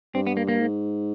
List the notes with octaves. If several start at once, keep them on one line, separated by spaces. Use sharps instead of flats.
G2 C4
B3
A#3
A#3
G#2